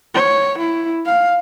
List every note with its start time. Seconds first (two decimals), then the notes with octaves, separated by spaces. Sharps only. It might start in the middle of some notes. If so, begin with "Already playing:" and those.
0.14 C#5
0.58 E4
1.06 F5